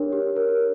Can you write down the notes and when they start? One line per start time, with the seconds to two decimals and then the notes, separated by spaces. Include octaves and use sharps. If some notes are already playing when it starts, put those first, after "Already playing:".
Already playing: D4 G4 A#4 C#5
0.13 G4
0.36 A#4